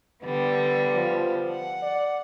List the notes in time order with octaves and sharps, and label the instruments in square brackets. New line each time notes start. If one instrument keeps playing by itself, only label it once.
[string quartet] D3 G3 B3
[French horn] F3
[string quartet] F#5
[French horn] D5